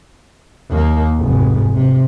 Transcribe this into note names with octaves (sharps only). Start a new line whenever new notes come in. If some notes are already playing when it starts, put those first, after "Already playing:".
D#2 A#3
F1 G#2
C3